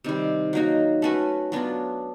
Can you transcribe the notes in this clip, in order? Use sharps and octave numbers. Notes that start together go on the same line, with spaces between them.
C3 D#3 G3
F#3 A#3 D#4 F#4
A3 C#4 F#4 B4
F#3 B3 D4 F4